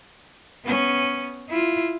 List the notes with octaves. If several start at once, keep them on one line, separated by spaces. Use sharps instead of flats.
B3 C#4
E4 F4